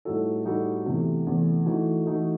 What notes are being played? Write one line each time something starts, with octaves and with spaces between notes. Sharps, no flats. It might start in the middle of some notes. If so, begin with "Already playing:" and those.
A2 G3 D#4 F#4 A4
A2 G3 D#4 F#4 A4
E2 C3 E3 A3
E2 C3 E3 A3
E3 A3 D#4 F#4 A4
E3 A3 D#4 F#4 A4